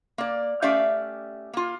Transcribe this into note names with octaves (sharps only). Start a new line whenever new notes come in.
A#3 D5
A3 C#4 G4 D5 E5 F5
A#3 F4